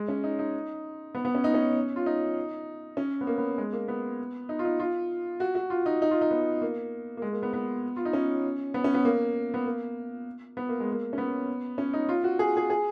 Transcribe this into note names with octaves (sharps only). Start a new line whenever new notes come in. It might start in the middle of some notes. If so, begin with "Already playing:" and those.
Already playing: G#3
C#4
D#4
D#4
B3
B3
C#4
D#4
C#4
F4
D#4
C#4
B3
A#3
B3
G#3
A#3
B3
D#4
F4
D#4
F4
F#4
F#4
F4
D#4
D#4
F4
D#4
B3
A#3
A#3
G#3
A#3
B3
B3
F4
D#4
C#4
B3
C#4
B3
A#3
B3
A#3
B3
A#3
G#3
A#3
C#4
B3
C#4
D#4
F4
F#4
G#4
G#4
G#4